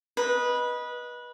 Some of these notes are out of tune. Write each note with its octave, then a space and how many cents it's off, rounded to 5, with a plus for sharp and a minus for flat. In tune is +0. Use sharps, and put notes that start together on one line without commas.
B4 -20 D#5 +0